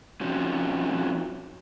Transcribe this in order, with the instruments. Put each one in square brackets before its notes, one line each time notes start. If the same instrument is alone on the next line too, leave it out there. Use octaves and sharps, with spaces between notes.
[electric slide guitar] F3 C4 C#4 D#4 F#4